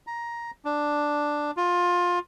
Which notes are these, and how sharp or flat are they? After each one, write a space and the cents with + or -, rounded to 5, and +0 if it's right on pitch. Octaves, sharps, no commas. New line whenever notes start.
A#5 +10
D4 +5
F4 +20